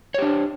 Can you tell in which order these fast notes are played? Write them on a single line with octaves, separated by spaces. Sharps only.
C#5 G4 D4 C5